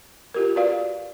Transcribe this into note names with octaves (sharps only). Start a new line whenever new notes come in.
F4 G4 A#4
F#4 B4 D5 F5